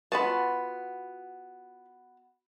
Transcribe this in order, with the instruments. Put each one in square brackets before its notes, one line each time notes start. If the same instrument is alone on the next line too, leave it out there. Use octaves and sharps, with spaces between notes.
[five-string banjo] B3 F#4 A5 [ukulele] F4 B5